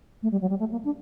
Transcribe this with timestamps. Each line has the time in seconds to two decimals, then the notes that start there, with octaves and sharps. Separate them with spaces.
0.23 A3
0.32 G3
0.41 F#3
0.50 G3
0.60 A3
0.72 A#3
0.84 D4